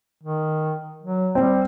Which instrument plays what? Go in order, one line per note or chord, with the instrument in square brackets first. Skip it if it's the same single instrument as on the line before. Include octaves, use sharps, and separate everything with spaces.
[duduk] D#3
F#3
[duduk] G3 [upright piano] C4